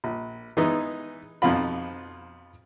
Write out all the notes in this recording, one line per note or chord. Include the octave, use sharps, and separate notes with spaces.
A#1
E3 G#3 B3 D#4
F2 B2 F3 D#4 F4 B5